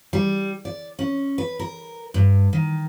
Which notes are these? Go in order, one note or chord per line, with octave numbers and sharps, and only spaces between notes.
G3
D5
C#4
B4
A#4
G2
D#3